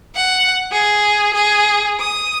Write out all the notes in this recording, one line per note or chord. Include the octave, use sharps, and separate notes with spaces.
F#5
G#4
G#4
D#6